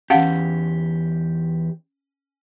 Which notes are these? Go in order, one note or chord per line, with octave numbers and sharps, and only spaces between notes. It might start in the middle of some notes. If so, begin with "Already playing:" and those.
E2 C#4 G4 F5 F#5